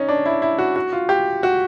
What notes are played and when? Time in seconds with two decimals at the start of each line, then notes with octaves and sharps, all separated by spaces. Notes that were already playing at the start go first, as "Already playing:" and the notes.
Already playing: C#4 D#4
0.09 D4
0.26 E4
0.42 E4
0.59 F#4
0.76 F#4
0.93 F4
1.09 G4
1.43 F#4